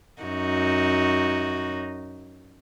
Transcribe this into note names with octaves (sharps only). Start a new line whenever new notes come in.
F#2 D#4 F#4